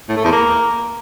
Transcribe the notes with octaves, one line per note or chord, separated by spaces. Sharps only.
A2
A3
E2
A#3